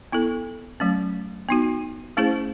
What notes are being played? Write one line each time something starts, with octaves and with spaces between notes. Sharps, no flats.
B3 E4 A4
F#3 A3 C#4
B3 D#4 F#4
A3 C#4 E4 G#4 C5